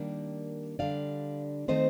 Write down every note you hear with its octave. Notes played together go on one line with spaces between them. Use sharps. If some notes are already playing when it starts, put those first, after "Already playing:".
Already playing: D#3 G3 A#3 D4
D3 G3 D4 D5 F5
D#3 A3 C4 C5 D#5